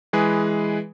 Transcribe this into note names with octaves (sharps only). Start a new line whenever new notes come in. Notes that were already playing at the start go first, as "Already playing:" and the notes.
E3 G#3 G#4 B4